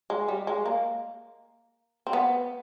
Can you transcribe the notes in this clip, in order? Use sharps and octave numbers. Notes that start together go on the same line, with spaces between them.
G#3
G3
G#3
A#3
C4
B3